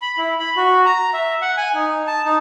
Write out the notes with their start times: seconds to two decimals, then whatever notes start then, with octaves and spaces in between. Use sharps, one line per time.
0.02 B5
0.18 E4
0.39 B5
0.57 F#4
0.85 A#5
1.13 E5
1.42 F#5
1.57 G#5
1.74 D#4
2.07 A5
2.25 D#4